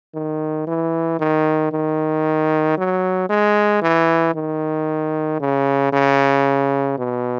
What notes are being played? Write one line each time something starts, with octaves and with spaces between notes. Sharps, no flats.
D#3
E3
D#3
D#3
F#3
G#3
E3
D#3
C#3
C#3
B2